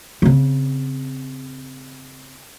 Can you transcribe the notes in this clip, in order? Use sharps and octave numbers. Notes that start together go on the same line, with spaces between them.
C#3 C4